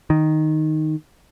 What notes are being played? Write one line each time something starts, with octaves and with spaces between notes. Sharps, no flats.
D#3